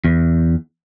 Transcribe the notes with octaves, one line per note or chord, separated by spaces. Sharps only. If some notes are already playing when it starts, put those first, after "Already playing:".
E2